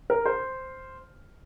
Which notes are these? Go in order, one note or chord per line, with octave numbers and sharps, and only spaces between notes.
A#4
C5